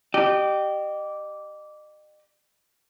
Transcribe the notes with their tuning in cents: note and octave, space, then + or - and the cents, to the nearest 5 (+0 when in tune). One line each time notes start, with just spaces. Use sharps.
G4 -15 D#5 -35